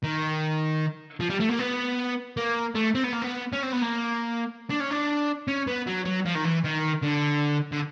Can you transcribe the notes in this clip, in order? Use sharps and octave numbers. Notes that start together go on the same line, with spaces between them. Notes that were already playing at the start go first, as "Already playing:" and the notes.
D#3
F3
G3
A3
A#3
B3
A#3
A3
C4
B3
A#3
B3
C#4
C4
B3
A#3
D4
C#4
D4
C#4
B3
F#3
F#3
F3
D#3
E3
D#3
D3
D3